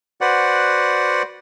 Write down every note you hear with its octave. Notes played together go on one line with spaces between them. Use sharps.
F#4 B4 C5 D5 F#5